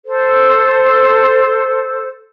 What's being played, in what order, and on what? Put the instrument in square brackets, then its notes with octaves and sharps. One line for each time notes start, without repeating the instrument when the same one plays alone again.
[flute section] A4 C5